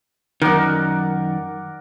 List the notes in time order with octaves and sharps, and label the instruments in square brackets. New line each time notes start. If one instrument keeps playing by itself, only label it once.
[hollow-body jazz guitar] F#2 D#3 [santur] A#4 D5 F#5